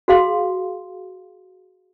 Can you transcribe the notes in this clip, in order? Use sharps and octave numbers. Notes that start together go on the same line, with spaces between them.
F#4 G#4 F5 C6